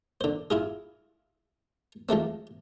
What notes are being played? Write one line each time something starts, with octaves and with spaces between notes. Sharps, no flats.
D3 C5
E4 F4 G#4
F3 G#3 A3 C4